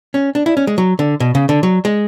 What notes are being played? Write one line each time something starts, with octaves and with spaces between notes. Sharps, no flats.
C#4
D4
E4
C#4
G#3
F#3
D3
B2
C#3
D3
F#3
G#3